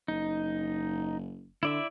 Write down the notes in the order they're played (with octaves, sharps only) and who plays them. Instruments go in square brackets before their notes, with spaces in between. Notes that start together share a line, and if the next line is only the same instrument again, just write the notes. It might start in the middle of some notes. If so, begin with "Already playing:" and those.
[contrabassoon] F#1 [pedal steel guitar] D#4
[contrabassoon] D3 [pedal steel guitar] E4 D5 E5